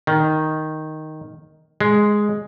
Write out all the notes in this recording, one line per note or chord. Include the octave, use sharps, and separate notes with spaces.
D#3
G#3